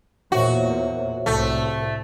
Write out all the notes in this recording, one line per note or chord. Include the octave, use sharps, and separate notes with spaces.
E2 A#2 F#4 C5 C#5 E5
C2 A2 A3